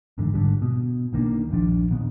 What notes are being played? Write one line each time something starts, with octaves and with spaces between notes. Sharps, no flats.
G1 E2 G#2 D3
G#1 G#2 D3 G3
B2
B1 D#3 A#3 D4
D#1 A#1 F3 D4
A#2 D#3 B3